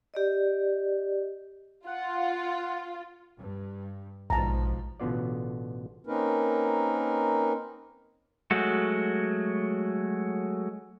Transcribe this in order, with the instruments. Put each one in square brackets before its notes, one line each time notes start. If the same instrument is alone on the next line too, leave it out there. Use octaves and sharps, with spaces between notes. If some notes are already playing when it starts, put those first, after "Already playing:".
[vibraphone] G4 D5 D#5
[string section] F4 [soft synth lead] F#5
[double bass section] G2
[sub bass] A#1 [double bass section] G#2 B2 F3 [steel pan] A5 A#5
[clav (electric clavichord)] A1 B2 D3 B3 F4 D5
[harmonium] A#3 C4 C#4 D#4 A#4 B4
[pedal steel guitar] F#3 G#3 A3 F#4